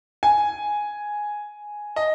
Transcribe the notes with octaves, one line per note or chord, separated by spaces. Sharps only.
G#5
D#5